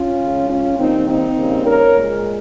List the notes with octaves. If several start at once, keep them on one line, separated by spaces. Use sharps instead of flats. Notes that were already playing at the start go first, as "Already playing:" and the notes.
Already playing: C#4 F4
C#3 G#3
C#4 F4
D#3 G3 A#3 C4 D#4
C4 D#4
C#3 G3 A#3
A#4 C#5
A#2 G#3